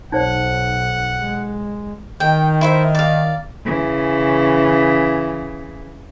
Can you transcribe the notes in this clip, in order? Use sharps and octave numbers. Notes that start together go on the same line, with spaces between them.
B1 D#4 C5 C#5 F#5
G#3
D#3 G5
E4 C5 E5
D5 F5
C#3 E3